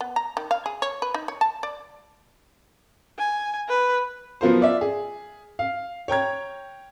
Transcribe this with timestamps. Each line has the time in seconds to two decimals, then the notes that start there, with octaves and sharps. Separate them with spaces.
0.01 B3
0.16 A#5
0.37 D#3
0.51 F5
0.66 G#4
0.82 C#5
1.02 B4
1.14 D#4
1.28 C#5
1.41 A5
1.63 D5
3.18 G#5
3.69 B4
4.41 F3 F#3 B3 F4 A#4 C5
4.61 F4 D5 E5
4.81 G#4
5.59 F5
6.08 C#5 G5 A#5 G#6